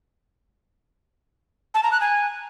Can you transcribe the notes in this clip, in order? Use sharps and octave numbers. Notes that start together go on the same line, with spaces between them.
A5
A#5
F#6
G#5